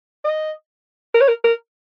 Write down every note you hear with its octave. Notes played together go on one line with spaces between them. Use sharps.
D#5
A#4
C#5
A#4
A#4